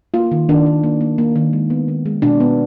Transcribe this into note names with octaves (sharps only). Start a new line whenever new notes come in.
A#3 F4
D#3
D#3 D4
D#3
A#3
A#3
A#3
D#3
G#3
B3
D#3
G#3
B2 D4
B3